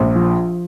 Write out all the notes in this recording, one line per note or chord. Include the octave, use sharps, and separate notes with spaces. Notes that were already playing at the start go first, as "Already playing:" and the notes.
Already playing: A#1
F3